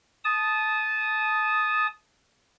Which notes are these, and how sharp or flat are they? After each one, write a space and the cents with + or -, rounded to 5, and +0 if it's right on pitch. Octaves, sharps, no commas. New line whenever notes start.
A5 -20 D#6 +0